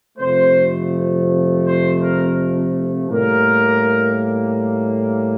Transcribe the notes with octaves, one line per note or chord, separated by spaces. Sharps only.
F2 C3 F3 A3 C5
C5
A#4
A2 G3 A#3 A#4